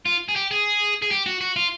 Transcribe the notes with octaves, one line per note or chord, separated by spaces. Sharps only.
F4
G#4
G4
G#4
G#4
G4
F#4
F#4
F4